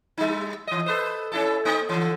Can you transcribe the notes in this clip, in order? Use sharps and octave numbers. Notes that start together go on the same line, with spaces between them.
G3 D#4
E3 D#5
A4 B4 C5
C#4 E4 A4
A#3 C4 D#4
D3 E3